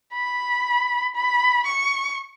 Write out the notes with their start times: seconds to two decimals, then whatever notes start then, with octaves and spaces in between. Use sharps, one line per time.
0.14 B5
1.15 B5
1.66 C#6